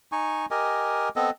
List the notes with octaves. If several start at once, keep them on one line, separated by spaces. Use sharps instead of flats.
D#4 G#5 C#6
G4 A#4 D#5 G#5
B3 C4 A4 D#5